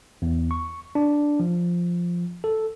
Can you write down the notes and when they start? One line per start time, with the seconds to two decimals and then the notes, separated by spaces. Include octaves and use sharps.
0.22 E2
0.51 C#6
0.95 D4
1.40 F3
2.44 A4